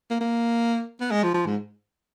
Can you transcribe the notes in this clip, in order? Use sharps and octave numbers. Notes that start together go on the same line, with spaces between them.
A#3
A#3
B3
G#3
F3
F3
G#2